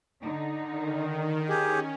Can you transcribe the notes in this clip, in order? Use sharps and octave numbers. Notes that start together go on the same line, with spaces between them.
D3 D#4
D#3
C#4 G4 G#4